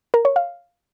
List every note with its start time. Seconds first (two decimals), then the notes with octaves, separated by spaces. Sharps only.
0.14 A#4
0.25 C#5
0.36 F5